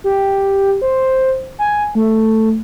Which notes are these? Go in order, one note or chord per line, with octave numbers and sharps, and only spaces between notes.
G4
C5
G#5
A3